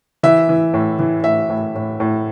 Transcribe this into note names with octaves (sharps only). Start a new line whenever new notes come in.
E3 E5
E3
A2
E3
A2 E5
A2
A2
A2